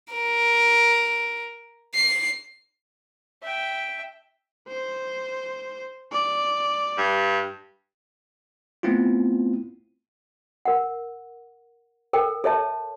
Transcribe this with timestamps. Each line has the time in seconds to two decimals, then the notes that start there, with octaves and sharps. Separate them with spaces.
0.13 A#4
1.95 C7
3.43 E5 G5
4.68 C5
6.12 D5
6.98 G2
8.83 A3 B3 C4 E4 F4
10.65 A#4 F#5
12.13 A4 A#4 G5
12.44 A4 C#5 E5 A5